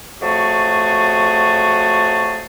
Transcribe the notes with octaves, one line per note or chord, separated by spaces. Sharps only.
F2 F#3 A3 F#4 G#4 A5